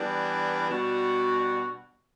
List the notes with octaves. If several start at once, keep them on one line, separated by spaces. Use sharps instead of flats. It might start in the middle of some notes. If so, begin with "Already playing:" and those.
Already playing: E3 G3 B3 D4
B2 G3 D4 F#4